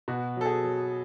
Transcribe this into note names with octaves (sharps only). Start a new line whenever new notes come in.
B2 F#4
F#3 A4
G#4
F#3